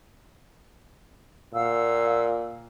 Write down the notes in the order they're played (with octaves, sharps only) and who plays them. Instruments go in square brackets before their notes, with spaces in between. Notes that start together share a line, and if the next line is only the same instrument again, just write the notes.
[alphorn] A#2 [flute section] F5 F#5 E6